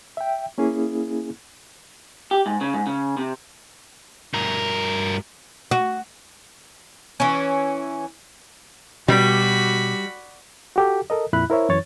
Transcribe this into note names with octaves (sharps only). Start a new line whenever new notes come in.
E5 G5
A#3 C#4 E4 G#4
G4
G#2
C#3
G#2
C#3
C3
G2 A#4
F#4
E3 C#4
B2 G3 F#4 B5
F#4 G4 A4
A4 A#4 D#5
F2 A#2 E4 B5 F#6
E4 A#4 C5 C#5 E5
F#2 E3 C#5 A6